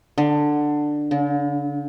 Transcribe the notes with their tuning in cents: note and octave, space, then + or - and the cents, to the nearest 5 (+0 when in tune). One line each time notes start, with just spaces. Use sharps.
D3 +10
D3 -45